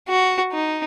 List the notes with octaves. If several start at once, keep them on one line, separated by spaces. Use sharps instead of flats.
F#4
D#4